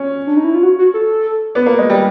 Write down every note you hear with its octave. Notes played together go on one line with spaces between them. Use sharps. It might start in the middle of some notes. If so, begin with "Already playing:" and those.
Already playing: C#4
D4
D#4
E4
F4
F#4
F#4
A4
B3
A#3
G#3
G3